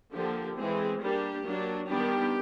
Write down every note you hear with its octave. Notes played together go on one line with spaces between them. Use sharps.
D3 F3 A#3 G4
E3 G#3 C4 G#4
G3 A#3 D4 G4
F#3 A#3 D4
D#3 G3 B3 D4 G4